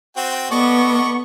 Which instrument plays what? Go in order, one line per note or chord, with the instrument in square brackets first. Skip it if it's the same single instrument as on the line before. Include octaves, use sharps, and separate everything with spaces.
[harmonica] C4 F#4 G5
[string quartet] B3 [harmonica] A4 D5 D#5 [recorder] C#6